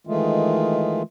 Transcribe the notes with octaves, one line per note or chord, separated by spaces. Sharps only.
D#3 E3 G#3 A3 F4